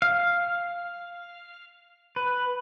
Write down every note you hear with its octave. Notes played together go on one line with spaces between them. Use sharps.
F5
B4